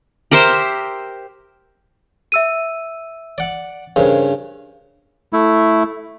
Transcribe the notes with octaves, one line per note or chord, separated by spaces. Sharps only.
G4 A#4 C5 E5
E5 E6 D#7
D5 F#5
G2 C#3 A#4 C5
A3 E4